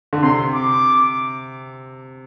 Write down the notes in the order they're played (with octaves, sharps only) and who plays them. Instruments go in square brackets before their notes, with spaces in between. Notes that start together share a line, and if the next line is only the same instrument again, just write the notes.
[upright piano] D3
[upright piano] C3 [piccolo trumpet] C6
[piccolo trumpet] D6